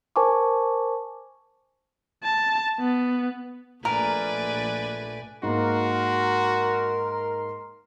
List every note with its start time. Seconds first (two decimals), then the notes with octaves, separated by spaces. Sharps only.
0.16 A#4 C5 G#5 A5 C#6 D6
2.23 A5
2.80 B3
3.85 A#1 A3 A#4 B4 D5 G#5
5.43 G#2 A#3 F#4 A#4 C6